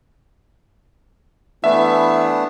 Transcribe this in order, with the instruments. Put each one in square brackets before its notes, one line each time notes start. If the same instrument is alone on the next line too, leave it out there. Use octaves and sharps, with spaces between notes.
[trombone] E3 [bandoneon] A3 B3 D4 [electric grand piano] E5